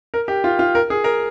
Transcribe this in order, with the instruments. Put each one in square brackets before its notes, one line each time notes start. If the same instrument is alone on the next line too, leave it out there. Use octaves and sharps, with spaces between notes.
[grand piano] A#4
G4
F4
F4
A#4
G#4
A#4